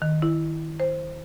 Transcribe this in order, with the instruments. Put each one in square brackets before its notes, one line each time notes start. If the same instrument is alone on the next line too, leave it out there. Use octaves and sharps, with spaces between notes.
[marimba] D#3
E4
C5